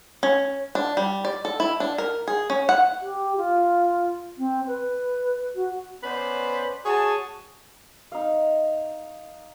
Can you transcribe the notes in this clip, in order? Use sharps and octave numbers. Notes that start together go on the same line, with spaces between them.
C#4
D4
G3
D5
A4
E4
D4
A#4
G#4
C#4
F#5
G4
F4
C4
B4
F#4
B3 C#4 B4 C5 D5
F#4 G#4 C#5 G#5 A5
D#4 F5